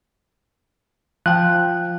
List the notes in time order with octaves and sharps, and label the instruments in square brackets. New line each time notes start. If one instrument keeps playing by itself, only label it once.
[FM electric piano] F3 [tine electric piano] G5 F#6